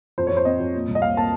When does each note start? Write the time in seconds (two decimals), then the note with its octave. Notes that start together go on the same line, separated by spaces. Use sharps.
0.18 F2 C5
0.27 C#5
0.31 F2
0.37 C5
0.45 C4 D#5
0.59 F2
0.75 A#2
0.88 C2
0.95 D#5
1.02 A#2 F5
1.17 A#3 A5